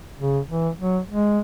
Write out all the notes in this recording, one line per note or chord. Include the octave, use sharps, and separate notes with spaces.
C#3
E3
F#3
G#3